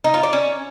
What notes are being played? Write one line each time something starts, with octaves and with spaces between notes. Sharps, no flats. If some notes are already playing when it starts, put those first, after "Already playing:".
D#4
F4
D5
C#4